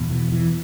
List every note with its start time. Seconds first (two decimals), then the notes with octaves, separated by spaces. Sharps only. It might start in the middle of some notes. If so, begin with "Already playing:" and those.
Already playing: E2 B2
0.10 E3
0.32 E3